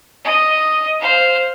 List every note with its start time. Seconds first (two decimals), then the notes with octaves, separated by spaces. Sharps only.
0.25 D#5
1.00 C5 F5